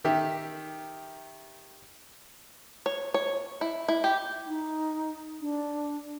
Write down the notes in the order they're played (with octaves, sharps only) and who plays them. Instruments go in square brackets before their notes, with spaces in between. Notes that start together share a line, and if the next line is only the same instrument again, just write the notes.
[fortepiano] D#3 G4 E5
[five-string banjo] C#5
C#5
E4
E4
G4
[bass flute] D#4
D4